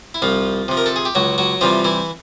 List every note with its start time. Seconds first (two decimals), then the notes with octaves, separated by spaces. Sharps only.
0.14 E4
0.22 C2 F3 F4
0.68 C3 F3
0.77 A#4
0.86 A4
0.96 G#4
1.05 G4
1.15 C#2 F#3 F#4
1.38 F#3 F#4
1.61 C3 E3 F3 G3 F4
1.85 E3 E4